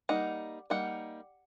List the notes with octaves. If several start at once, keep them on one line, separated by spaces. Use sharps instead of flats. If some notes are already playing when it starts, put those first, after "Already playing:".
G3 A#3 D#4 F#5
G3 A#3 D#4 F#5